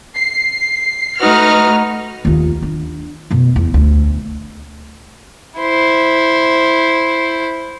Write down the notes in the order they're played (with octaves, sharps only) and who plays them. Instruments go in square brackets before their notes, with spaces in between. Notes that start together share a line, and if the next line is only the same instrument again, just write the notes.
[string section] C7
[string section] A3 B4 F6 [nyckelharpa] D#4 F#4
[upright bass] D#2 F4
D4
F#1 B2
E2
D2
[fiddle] E4 C5